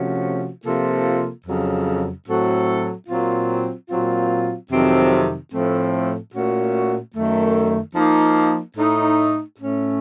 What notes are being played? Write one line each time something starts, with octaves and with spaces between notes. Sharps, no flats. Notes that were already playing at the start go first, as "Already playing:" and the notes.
Already playing: C3 F3 A3 C#4 F#4
C3 F3 A#3 F4 A4
F2 C#3 F#3
A2 F#3 C4 F#4 A4
A#2 F#3 C4 F4
A#2 F#3 C4 F4
F2 C3 D#3 F#3 C4
A2 F3 A3 C4
A#2 A3 C#4 F#4
F#2 D#3 A3
F3 A#3 D#4
A2 A3 D#4
A2 A3 C#4